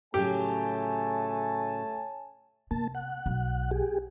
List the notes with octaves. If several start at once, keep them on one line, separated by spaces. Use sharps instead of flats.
A2 C#3 F#3 A3 G4 C#5 G#5 A5
C3 A#3 A5
F#5
B1
G4 G#4